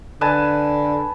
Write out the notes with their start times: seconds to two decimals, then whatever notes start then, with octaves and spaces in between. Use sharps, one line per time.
0.21 D3 B4 G#5 A5